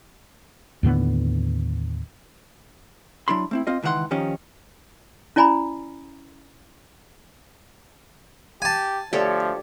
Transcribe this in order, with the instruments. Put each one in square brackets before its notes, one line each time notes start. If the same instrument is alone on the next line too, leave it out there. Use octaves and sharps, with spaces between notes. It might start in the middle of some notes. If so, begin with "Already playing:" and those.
[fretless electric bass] D#2 A2 D3 B3
[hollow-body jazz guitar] F#3 D4 E4 B5 C6
A3 C4 E4
C4 F4 D#5
C#2 D#3 E3 D4 F#5 C6
D#3 F3 C#4 D#4 G4
[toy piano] C#4 E4 D5 G#5 A#5 B5
[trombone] G4 [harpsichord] G#5 A5
[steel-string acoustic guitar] D2 [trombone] F3 [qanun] G4 A4 C#5